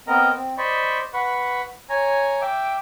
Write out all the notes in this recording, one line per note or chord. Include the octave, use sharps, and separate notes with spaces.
B3 C4 A#4 D#5 A#5
C4
C5 D5 D#5 B5 C#6
B4 F#5 B5 C#6
C#5 G#5 A#5
E5 G5 D6